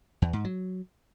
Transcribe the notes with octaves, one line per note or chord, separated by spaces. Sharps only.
E2
G#2
F#3